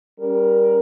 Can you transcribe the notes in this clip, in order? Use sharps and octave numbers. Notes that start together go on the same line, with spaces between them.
G3 C#4 A#4